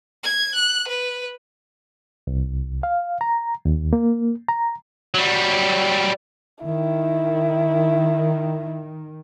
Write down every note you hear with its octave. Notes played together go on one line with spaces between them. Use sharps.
G#6
F#6
B4
C2
F5
A#5
D#2
A#3
A#5
F#3 G3
D#3 E4